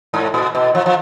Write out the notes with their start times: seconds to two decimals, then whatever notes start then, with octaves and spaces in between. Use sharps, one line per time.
0.14 G#2
0.34 A#2
0.55 B2
0.75 F3
0.86 F3